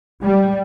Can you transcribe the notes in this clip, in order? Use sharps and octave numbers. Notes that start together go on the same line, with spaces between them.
G3